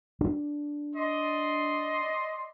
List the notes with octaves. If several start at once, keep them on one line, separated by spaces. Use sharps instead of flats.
D4
D5 D#5 C6